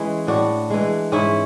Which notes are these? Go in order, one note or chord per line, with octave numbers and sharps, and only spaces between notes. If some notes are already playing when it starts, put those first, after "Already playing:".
Already playing: E3 G#3 C#4 E4
A2 D4 F#4
E3 G#3
G#2 C#4 E4